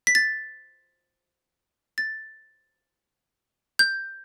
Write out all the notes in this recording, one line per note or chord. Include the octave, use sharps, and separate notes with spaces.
B6
A6
A6
G6